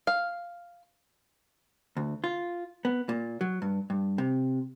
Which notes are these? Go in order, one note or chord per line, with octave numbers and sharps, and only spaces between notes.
F5
D2
F4
B3
A#2
F#3
G2
G2
C3